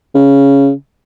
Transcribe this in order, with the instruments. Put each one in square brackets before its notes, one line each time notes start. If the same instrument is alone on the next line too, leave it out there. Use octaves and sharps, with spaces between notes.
[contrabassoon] C#3